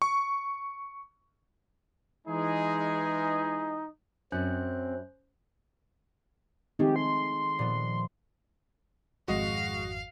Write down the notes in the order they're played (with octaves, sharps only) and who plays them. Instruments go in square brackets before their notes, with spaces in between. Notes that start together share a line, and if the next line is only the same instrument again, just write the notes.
[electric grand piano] C#6
[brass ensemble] E3 G#3 G#4 [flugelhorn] D#4
[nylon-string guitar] F#2 F#4 D5 [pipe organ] C4 [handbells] C#4 C5 F#6
[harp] D#3 G#3 A3 [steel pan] C4 D#4 [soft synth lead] G4
[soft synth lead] C6
[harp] A#2 F3 B3
[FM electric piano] G#1 F2 [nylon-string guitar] G#3 [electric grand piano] F#4 D#5 [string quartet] F5